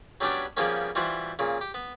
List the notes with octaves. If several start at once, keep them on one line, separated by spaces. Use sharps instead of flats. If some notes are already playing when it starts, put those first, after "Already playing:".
F#3 G3 B3 C#4 D4 G4
C#3 F3 G3 A#3 B3 C#4
E3 G3 F4 F#4 C5
A#2 C#3
G4
B3